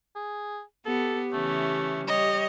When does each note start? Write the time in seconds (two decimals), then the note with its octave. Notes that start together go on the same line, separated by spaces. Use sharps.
0.16 G#4
0.86 B3 G4 A4
1.33 C#3 E3 A3 C#4
2.07 G3 C#5 D#5